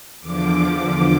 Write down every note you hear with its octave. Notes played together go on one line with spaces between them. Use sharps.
E2 D3 F3 D6